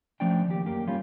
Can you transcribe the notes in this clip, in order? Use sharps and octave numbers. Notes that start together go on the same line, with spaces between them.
F3 A3 C#4 D4 D5 G5
D#2 G4
F#2 A#3 G4
G3 A#3 C#4 F4